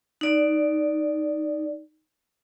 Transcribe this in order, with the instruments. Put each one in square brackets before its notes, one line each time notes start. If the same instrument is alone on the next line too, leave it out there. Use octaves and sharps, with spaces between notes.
[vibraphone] D#4 D5